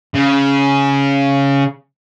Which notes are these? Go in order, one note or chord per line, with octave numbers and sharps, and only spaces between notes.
C#3